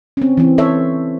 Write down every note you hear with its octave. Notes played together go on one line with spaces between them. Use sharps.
C4 C#4
E3 C4
A4 C5 C#5 E5